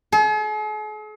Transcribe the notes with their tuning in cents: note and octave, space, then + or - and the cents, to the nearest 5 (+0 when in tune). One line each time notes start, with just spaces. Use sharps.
G#4 +45